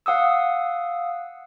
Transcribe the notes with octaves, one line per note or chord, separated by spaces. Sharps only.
F5 F#5 D#6 E6